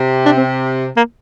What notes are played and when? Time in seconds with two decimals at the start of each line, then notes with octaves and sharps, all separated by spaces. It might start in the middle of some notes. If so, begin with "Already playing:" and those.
Already playing: C3
0.25 D4
0.37 C4
0.97 A#3